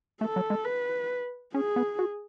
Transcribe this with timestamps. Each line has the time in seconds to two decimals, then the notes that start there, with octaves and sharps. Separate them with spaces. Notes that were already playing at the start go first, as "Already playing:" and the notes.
0.21 A3 A4
0.36 F#3
0.50 G#3
0.65 B4
1.54 C#4 G#4
1.76 B3
1.99 F#4